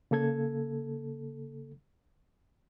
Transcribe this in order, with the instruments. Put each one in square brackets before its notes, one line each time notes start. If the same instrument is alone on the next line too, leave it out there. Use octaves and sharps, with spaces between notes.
[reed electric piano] C#3 A#3 A4 G#6